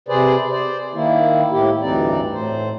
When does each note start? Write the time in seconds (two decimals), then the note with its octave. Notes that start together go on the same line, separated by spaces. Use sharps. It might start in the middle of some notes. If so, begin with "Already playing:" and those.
0.08 C3 G#4 B4 C5 D5
0.51 C5 D5
0.94 D#3 A#3 E4
1.52 A2 E4 G4
1.81 D2 G2 E3 C4 D#4 D5
2.33 A2 C5